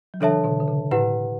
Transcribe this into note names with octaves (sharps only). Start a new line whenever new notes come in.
F#3
C#3 E3 D4 A4 C#5 E5 A5
B2 D3
D3
C#3
A2 E4 G4 B4 F#5